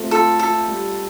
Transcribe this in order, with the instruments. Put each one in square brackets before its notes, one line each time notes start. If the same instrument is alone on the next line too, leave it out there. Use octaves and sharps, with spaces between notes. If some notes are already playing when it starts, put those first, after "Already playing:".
Already playing: [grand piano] A3 C4 F4
[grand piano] F4 [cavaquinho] A4
[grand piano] F4 [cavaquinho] A4
[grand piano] G3